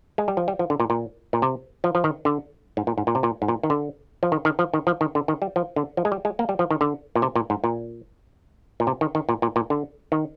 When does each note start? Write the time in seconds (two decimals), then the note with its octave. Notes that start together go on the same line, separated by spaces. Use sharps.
0.18 G#3
0.28 G3
0.37 F3
0.48 G3
0.59 F3
0.70 D3
0.80 A#2
0.90 A#2
1.33 A#2
1.42 C3
1.84 F3
1.95 F3
2.04 D#3
2.25 D3
2.77 G#2
2.87 A#2
2.98 G#2
3.07 A#2
3.15 C3
3.23 A#2
3.42 G#2
3.48 A#2
3.63 D#3
3.70 D3
4.23 F3
4.32 D#3
4.45 D#3
4.59 F3
4.74 D#3
4.87 F3
5.01 D#3
5.15 D3
5.28 D#3
5.42 G3
5.56 F3
5.76 D3
5.97 F3
6.05 G#3
6.12 G3
6.25 G#3
6.39 A#3
6.49 G3
6.59 F3
6.71 D#3
6.81 D3
7.16 A#2
7.22 C3
7.36 A#2
7.50 G#2
7.64 A#2
8.80 A#2
8.87 C3
9.01 D#3
9.15 D#3
9.29 A#2
9.42 A#2
9.56 A#2
9.70 D3
10.12 D#3